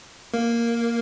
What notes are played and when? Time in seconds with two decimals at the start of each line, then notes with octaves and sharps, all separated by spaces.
0.34 A#3